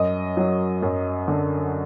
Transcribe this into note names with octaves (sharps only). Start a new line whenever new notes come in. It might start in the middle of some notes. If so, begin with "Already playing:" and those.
Already playing: F#2 D#5
F#3
F#2
D3